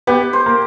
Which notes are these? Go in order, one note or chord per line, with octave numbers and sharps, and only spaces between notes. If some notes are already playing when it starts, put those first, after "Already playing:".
B3 G4
C5
A#3